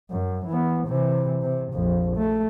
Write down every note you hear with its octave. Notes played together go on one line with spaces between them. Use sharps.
F#2
E3 B3
C3 E3
C3
A#1 F2
A3